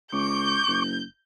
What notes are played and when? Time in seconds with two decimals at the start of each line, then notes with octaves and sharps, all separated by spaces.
0.12 C#2 C#6 D6 G6
0.68 F#1